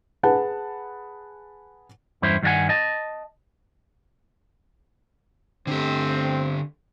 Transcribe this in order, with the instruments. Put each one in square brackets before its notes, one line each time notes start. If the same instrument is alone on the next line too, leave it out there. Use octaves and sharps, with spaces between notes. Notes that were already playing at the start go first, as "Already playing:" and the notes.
[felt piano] G#4 B4 F#5 A5
[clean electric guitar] E2 G2 C#4 E4 C5
G2 D#3 G3 F4 F#5 G#5
D#5 A5
[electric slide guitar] D3 G4 [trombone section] A3 C4